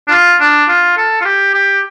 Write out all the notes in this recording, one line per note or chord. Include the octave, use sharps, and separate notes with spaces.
D4
F4
D4
F4
A4
F4
G4
G4